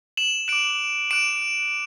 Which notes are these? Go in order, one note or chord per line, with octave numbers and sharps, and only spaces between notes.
E7 F#7
D6 F#6 D7 E7
D6 F#6 D7 E7